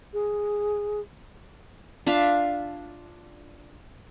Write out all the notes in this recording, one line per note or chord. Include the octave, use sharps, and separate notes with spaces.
G#4
D4 F4 E5 F5